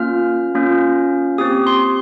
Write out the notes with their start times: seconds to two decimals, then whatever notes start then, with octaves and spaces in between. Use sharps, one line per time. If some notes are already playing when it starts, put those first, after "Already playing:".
Already playing: A#3 C#4 F4 F6
0.55 A#3 C#4 F4
1.38 C4 G4 D#6
1.67 C6